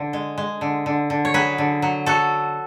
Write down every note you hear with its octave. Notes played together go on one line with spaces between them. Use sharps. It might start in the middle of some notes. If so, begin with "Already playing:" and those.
Already playing: D3
G#3
G#3
D3
D3
D3
C#5
F#3 G#4 B4
D3
F#3
F#3 F#4 A4